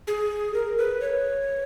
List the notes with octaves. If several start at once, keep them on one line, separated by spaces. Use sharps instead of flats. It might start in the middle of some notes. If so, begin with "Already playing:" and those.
G#4
A#4
B4
C#5